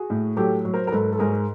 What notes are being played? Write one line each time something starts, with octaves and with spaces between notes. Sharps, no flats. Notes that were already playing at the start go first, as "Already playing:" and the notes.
Already playing: F#4 G#4
A2
F#3 G4 A4
F#3
A#4 C5
A#4
G#2 A4 B4
A4
G#2 G#4 A#4